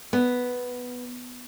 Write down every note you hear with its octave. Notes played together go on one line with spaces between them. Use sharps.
B3